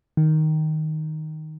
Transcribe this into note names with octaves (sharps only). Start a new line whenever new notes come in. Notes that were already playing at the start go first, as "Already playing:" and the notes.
D#3